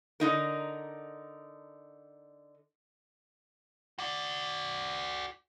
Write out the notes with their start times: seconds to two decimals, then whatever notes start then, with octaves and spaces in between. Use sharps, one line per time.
0.20 D3 D#4 A#4
3.99 F#4 D5